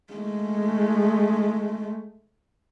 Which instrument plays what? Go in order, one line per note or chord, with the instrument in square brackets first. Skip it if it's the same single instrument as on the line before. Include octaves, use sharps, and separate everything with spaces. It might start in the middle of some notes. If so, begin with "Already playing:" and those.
[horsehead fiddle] G#3 A3